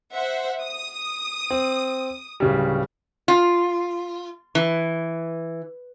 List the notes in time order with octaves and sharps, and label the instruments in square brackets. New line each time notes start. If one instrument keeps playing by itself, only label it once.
[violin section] C5 E5 F#5
D#6
[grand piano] C4
D1 C#3 G3
[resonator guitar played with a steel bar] F4
E3